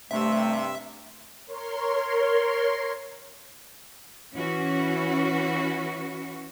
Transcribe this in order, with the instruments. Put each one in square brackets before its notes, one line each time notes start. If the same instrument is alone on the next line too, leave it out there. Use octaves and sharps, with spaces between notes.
[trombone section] G2 C3 [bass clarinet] A3 [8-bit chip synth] E5
[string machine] A#4 C#5 C6
[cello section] E3 C#4 F#4